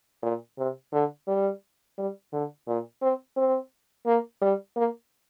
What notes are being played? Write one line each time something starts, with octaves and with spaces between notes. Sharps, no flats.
A#2
C3
D3
G3
G3
D3
A#2
C4
C4
A#3
G3
A#3